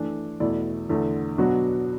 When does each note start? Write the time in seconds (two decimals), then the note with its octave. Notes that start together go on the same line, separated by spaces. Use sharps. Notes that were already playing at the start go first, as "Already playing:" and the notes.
Already playing: E3 A3 D4
0.40 E2 B2 A3 E4 D5
0.89 E2 D3 A3
1.38 B2 F#3 B3 D4 F#4